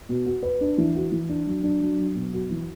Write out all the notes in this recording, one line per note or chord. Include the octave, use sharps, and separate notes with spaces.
B2
F#4
B4
D4
E3
F#4
E3
D4
F#3
D4
F#3
F#3
B2
F#4
E3